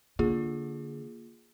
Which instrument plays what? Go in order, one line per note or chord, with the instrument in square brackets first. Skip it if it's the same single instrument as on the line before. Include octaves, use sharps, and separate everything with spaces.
[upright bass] D3 [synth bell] A#3 F4 G#4